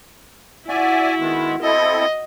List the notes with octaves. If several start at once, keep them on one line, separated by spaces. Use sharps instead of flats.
E4 F#4 D5 E5 G#5
D#3 G#3 B3
C4 E4 A4 D#5